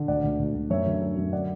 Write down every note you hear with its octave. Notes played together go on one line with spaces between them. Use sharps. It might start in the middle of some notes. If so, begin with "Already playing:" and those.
Already playing: D3
D2 D5 F#5
D2
D2
D2
F#2 C#5 E5
D3
D3
F#2
D3 D5 F#5